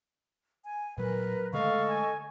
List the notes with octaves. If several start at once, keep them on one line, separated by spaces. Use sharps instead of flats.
G#5
A#2 F#3 A#4 B4
D3 G#3 A3 A4 D#5 F5 C#6
G#5